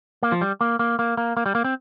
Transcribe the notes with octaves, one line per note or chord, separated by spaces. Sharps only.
A#3
F3
G3
A#3
A#3
A#3
A#3
A#3
G3
A#3
C4